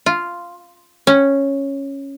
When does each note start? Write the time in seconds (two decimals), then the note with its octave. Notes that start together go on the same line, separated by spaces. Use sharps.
0.06 F4
1.07 C#4